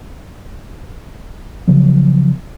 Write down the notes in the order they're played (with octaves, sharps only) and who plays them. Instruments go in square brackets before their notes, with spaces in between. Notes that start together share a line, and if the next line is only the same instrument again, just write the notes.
[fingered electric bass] C#3 F3 F#3 B3